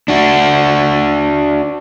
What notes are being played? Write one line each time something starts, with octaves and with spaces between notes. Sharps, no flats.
D4 F#4